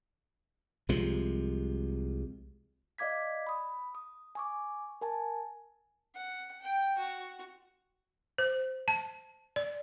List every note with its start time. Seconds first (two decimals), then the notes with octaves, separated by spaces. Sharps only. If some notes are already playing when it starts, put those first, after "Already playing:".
0.89 C2 C3 F3 G#3
2.98 D5 D#5 F5 D6 G#6 B6
3.47 B5 D#6
3.95 D#6
4.35 G#5 C#6 D6
5.01 A#4 G#5 A5
6.15 F#5
6.61 G5
6.98 F#4
8.38 C5
8.88 A5
9.56 D5